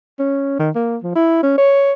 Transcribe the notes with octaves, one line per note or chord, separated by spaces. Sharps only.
C#4
D#3
A#3
F3
E4
C#4
C#5